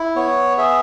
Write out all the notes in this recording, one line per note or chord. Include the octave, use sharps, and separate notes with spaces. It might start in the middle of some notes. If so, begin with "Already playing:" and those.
Already playing: E4
B3 C#5
G#4 E5